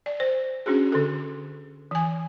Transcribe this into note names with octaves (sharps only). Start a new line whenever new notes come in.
D5
C5
C#4 D4 F#4 G#4
D3 A4
E3 G#5